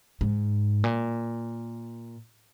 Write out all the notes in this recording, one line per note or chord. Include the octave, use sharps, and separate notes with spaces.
G#2
A#2